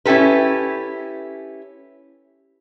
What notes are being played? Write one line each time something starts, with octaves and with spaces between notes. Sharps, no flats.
C#4 E4 G4 A4 B4